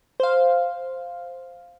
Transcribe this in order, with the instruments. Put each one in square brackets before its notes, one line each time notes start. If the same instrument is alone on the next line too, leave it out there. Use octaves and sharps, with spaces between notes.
[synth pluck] C5 F5